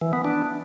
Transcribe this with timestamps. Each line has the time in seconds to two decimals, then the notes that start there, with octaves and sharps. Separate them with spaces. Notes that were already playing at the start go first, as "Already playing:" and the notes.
0.01 E3
0.13 B3
0.25 D4